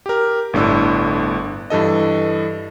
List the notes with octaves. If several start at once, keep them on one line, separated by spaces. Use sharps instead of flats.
G4 A#4
G1 A2 D4 E6
G2 E3 A4 D#5